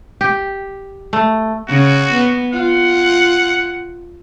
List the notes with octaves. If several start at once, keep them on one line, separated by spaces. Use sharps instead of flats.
G4
A3
C#3 F#4
B3
F4 F#5